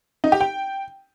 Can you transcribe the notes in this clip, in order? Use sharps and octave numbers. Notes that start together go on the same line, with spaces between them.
D#4
G4
G5